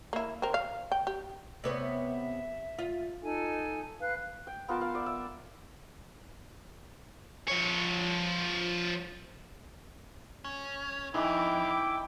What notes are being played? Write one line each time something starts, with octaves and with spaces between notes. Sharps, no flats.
A#3 E4
C4 A#4
F5
G5
G4
C3 B3 C#5
E5
F4
D#4 A4 G#5
B4 F5 F#6
G5
B3 F4 A#4 A5
F5
D5 E5
E5
F3 C#5
C#4
F2 D#3 E3 E4 E5 G5 D6